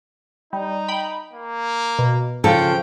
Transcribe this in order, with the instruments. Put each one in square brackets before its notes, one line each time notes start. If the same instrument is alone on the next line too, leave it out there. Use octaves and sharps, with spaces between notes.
[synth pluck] G3 [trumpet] D#4
[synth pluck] G5 B5
[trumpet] A#3
[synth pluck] B2
[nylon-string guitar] C#3 F3 A4 [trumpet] G5